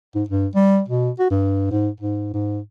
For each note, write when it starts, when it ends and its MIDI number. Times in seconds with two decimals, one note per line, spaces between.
0.15 0.23 44
0.29 0.47 43
0.55 0.80 55
0.88 1.10 47
1.19 1.29 66
1.30 1.66 43
1.71 1.89 44
2.00 2.31 44
2.34 2.60 44